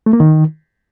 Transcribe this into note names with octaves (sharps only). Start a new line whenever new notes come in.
A3
A#3
D#3